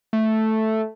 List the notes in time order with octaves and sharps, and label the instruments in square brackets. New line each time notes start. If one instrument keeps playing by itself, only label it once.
[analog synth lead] A3